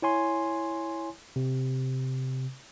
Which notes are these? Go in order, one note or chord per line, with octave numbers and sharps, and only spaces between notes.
E4 C#5 G#5 C6
C3